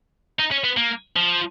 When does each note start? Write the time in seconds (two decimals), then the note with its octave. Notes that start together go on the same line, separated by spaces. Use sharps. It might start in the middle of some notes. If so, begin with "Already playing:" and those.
0.39 D#4
0.52 C#4
0.64 B3
0.77 A#3
1.16 F3